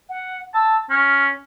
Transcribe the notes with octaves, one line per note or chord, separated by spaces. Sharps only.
F#5
A5 E6
C#4 F6